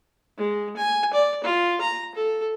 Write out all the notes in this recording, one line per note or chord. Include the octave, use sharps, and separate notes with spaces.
G#3
G#5
D5
F4
A#5
A4